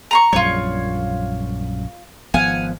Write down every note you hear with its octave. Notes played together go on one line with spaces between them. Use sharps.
A#5 C6 C#6
A#1 F#2 G3 F4 C#5
G#1 F3 B3 F5 F#5 G#5